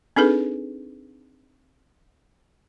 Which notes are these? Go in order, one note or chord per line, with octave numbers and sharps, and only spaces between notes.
C4 D4 D#4 G#4 A4 B4